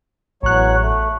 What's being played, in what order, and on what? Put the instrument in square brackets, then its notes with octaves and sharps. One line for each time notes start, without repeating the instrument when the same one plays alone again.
[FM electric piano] A1 F#6 [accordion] E2 F#3 C#5
[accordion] A3